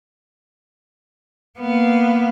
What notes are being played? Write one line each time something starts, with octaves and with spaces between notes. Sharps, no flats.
A#3 B3